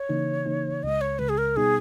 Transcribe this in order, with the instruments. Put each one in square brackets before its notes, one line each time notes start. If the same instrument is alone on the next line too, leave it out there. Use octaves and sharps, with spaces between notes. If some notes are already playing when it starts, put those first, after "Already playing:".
Already playing: [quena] C#5
[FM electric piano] C#3 E3 A#3 D#4
C#3 E3 A#3 D#4
[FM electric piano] C#2 C#3 G#3 [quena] D#5
[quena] C#5
[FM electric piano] C#2 C#3 G#3 [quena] B4
[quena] G#4
A#4
[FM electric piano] B2 G3 B3 D#4 [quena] G#4